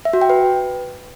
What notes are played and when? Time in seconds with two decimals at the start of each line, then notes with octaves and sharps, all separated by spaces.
0.05 E5
0.13 F#4
0.21 G5
0.30 B4